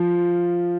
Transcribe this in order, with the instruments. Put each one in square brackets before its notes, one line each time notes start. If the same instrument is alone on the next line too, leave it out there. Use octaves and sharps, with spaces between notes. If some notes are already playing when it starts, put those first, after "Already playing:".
Already playing: [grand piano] F3